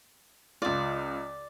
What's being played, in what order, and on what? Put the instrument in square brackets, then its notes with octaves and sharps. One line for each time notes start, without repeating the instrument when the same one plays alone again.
[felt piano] C#2 F4 [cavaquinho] D5 D6